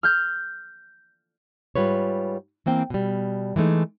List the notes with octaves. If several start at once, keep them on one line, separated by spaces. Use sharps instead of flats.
F6 G6
G#2 G3 F4 B4 C#5
E3 A#3 C4 G5
B2 G3
E3 G#3 A3 D#4